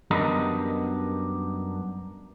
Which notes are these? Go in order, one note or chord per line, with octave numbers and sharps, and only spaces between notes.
F#2 G3 B3 D4 A#4 D#5